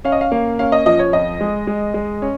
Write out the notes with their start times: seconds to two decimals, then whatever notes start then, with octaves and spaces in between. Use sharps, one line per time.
0.05 C#4 F5
0.12 D#5
0.21 F5
0.32 A#3
0.59 C#4 F5
0.72 D#5
0.86 F3 D#5
0.99 C#5
1.13 F2 D#5
1.41 G#3
1.67 G#3
1.94 G#3
2.22 C#4